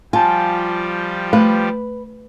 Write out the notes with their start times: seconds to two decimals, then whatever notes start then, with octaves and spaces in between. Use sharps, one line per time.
0.13 F3 G3 F4 G4 G#5 A5
1.33 A3 B4